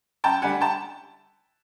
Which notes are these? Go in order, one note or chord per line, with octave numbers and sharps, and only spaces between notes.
F#2 G5 A5
D3 G3 F#5 G#5
G5 A5